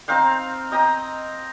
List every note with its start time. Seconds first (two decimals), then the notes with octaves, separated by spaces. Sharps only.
0.08 C4 D#4 F5 G5
0.72 D#5 G5 A#5 D#6